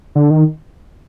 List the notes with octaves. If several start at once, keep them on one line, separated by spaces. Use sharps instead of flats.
D3
D#3